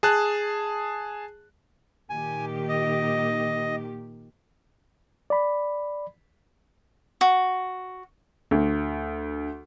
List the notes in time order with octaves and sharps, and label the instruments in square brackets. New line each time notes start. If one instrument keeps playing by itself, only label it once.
[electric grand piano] G#4 A5 F#6
[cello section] A#2 D#3 G4 [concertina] G#5
[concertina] D#5
[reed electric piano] D5 B5
[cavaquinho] F#4
[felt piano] D2